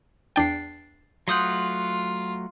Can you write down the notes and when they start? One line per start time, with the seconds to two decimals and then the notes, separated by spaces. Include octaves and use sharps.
0.36 E2 D4 G5 A6 C7
1.28 F#3 A3 F4 F#5 C6 D#6 G6